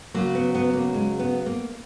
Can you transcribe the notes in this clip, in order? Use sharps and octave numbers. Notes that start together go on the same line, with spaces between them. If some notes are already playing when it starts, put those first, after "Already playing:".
C#3 F#3 A#3
B3
B3
A#3
G#3
B3
A#3